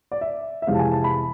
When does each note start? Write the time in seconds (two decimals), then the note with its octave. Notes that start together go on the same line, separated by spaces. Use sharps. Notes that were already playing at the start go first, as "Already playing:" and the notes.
0.12 D5
0.21 E5
0.62 E5
0.67 F2 C3 E3 G#3 F5
0.74 A5
0.79 G#5
0.92 A5
1.04 B5